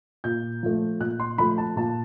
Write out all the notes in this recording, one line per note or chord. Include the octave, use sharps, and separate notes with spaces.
A#2 G6
F3 A3
A#2 F#6
C6
F3 A3 B5
A5
A#2 A5